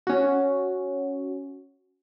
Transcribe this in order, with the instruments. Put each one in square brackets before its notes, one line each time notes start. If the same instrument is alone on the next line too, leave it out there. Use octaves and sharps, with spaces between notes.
[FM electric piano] C#4 F#4